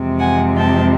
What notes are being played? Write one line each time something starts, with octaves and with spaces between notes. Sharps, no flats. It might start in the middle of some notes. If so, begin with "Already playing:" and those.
Already playing: F2 C3 E3 G#3 C4
F#5 G#5
G5 A5